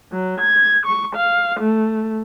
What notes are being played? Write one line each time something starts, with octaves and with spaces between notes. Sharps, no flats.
F#3
G#6
C#6
F5
A3